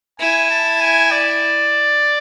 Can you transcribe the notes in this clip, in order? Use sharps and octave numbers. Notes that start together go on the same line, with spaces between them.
E4 G#5
A5
G#5
D5